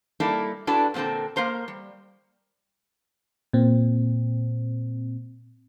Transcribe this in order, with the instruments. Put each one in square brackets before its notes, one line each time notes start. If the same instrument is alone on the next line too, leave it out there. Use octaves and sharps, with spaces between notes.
[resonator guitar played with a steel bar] G3 A#3 D#4 E4 A4 D5
D4 E4 F#4 A4 B4 D5
A#2 D3 C4 A4 A#4
A#3 A#4 C5 A#5
G3
[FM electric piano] A#2 C4